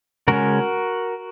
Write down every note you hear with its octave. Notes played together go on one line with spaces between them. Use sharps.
C#3 G#3 C#4 F#4 A#4